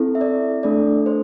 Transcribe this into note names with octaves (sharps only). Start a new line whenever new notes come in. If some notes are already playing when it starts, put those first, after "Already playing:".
Already playing: C4 E4 A4
E5
D5
A3 D4 A4 D5
C5